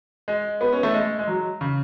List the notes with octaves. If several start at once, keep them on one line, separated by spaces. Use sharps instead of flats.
G#3
B3
C#4
A3
G#3
G#3
F#3
C#3